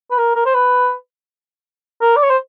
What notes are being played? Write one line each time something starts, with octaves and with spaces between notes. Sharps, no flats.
B4
A#4
A#4
C5
B4
A#4
D5
C#5
C5